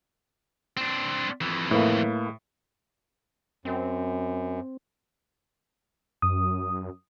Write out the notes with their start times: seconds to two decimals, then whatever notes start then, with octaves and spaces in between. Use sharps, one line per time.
0.77 C4 D4
1.41 F2 E3
1.71 A2 A#3 B4 E5
3.65 F#2 C4
6.22 F#2 D#6